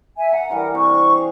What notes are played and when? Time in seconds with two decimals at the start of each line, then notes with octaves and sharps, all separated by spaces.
0.18 E5 G#5
0.33 F#5 A#5
0.49 D3 E3 G3 A#4
0.75 C3 C#6
1.10 G#4 F5